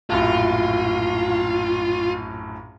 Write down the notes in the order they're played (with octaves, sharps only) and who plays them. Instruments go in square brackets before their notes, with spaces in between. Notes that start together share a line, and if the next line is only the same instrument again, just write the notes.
[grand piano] A#1 F#2 A2 [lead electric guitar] F4